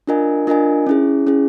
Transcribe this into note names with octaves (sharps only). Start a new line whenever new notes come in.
D4 F4 A#4 D#5 G#5
D4 F4 A#4 D#5 G#5
C#4 E4 G#4
C#4 E4 G#4